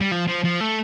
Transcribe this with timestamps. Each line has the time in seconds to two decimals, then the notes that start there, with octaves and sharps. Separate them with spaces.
0.01 G3
0.12 F3
0.27 F3
0.44 F3
0.60 A3